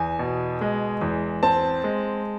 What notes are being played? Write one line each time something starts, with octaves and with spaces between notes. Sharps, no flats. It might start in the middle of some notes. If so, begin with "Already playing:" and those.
Already playing: E2 G#5
B2
G#3
E2
C4 A5
G#3